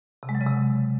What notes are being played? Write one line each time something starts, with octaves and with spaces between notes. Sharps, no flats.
C3
G#3
F#3
C#3
C3